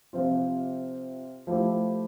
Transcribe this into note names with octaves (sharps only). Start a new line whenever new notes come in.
C3 F3 C4 F4
F3 A3 E4 G4